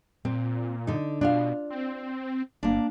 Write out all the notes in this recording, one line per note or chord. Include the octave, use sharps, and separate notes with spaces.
A#2 C4
D3 D#4
B2 D4 F4 F5
C4
G1 A#3 D4